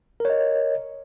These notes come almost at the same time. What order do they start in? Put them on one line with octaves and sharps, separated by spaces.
A#4 C#5 D#5